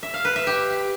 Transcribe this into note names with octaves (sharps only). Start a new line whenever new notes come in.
E5
F5
B4
E5
G4